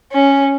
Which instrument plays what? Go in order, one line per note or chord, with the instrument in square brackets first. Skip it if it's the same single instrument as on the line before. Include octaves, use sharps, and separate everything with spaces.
[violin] C#4